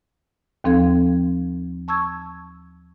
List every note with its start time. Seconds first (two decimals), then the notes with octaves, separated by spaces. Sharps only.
0.64 D#2 F3 C4 A4 F5 G#6
1.88 A5 C#6 E6 G#6